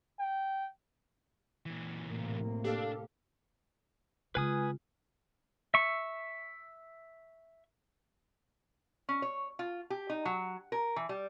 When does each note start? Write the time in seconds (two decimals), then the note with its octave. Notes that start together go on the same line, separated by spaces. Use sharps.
0.20 G5
1.66 A#2 E3
2.02 A2 C3 A#3
2.65 D4 G4 A4 F5
4.35 C#3 G#3 C4 F4 B4 G#5 D#6
5.74 E5 C#6
9.09 C#4
9.22 C#5
9.59 F4
9.90 G4
10.10 D#4
10.25 F#3
10.72 A#4
10.96 E3
11.09 G3